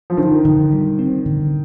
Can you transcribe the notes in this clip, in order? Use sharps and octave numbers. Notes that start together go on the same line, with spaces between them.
F3
D3 D#3
D3
G3
C4
D3